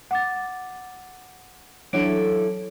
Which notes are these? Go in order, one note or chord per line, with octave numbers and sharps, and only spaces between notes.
F#5 D6 A6
E3 F#3 C#4 D4 E4 A4 C#5 D7